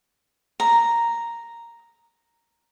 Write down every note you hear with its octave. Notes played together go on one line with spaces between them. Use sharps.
A#5